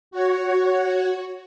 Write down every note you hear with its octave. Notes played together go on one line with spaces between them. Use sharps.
F#4 C#5